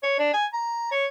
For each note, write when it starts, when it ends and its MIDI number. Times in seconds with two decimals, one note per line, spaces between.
0.03 0.14 73
0.19 0.29 62
0.34 0.45 80
0.53 0.88 82
0.91 1.06 73